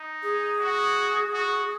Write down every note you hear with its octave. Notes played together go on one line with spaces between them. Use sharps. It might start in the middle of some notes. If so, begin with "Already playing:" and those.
Already playing: D#4
G#4
F#4
F#4